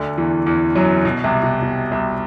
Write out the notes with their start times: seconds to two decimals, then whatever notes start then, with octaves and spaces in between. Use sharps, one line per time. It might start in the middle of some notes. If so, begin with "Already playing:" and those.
Already playing: D2 D3
0.18 E2 E3
0.46 E2 E3
0.75 F#2 F#3
1.05 B2
1.24 C2 C3
1.43 B2
1.62 B2
1.92 C2 C3